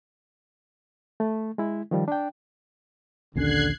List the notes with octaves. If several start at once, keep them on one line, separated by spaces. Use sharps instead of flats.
A3
G#3 E4
D#3 F3 G3
D4 G5
A#1 D#2 D3 C#4 F#6 G#6 C7